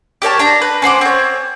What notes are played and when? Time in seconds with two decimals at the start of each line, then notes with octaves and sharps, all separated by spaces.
0.22 G4 A#4 C#5 A5
0.39 D4 A#5
0.62 B4
0.82 C#4 C5 F#5 D6
1.01 C4 C#5